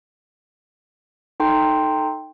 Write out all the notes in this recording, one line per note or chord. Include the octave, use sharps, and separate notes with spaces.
D#4 A4 G5 C6